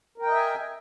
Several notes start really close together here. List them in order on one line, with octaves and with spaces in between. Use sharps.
A#4 G5 D#5 E5 G#5